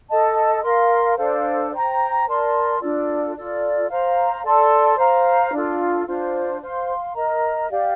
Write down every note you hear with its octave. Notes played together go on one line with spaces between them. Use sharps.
A4 D#5 A5
A#4 F5 C6
D4 A4 C5 F5
C5 G5 A#5
A#4 D5 A5 C6
D4 F4 A4 D5
F4 A4 D5
C5 F5 A#5
A4 D5 A5 C6
C5 F5 A#5
D4 F4 A4
D4 F4 C5
C5 F5 C6
A#4 D#5 A#5
G4 D5 F5